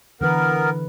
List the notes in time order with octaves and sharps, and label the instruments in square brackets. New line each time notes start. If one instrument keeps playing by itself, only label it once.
[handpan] D3 E3 B4 [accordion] B3 A#4